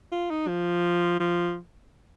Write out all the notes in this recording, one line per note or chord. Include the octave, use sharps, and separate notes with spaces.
F4
D#4
F3
F3